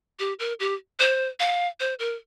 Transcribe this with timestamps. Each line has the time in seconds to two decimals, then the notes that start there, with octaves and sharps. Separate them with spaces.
0.19 G4
0.39 A#4
0.60 G4
0.99 C5
1.40 F5
1.80 C5
1.99 A#4